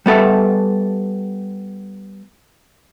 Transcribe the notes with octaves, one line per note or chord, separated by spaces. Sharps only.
G3 B3 A4 E5